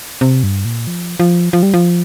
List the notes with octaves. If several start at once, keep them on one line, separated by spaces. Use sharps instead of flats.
C3
G2
A#2
F3
F3
F3
G3
F3